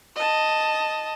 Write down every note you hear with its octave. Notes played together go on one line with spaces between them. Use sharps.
D#5 A5